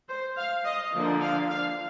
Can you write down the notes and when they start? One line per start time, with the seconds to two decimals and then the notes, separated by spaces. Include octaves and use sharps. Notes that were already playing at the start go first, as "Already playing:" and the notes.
0.08 C5
0.37 F5
0.65 D#5
0.93 D3 F3 A#3 D4
1.21 F5
1.49 F5